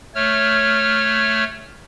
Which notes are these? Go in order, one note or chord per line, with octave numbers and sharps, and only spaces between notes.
A3 C#5 F6